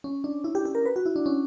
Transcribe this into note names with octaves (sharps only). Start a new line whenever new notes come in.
C#4
D4
E4
G4
G4
A#4
B4
F#4
E4
D4
C#4